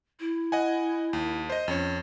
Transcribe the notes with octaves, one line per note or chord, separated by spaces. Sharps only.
E4
D#5 F#5 G#5
D#2
C5 D#5
F2 C#4 C#5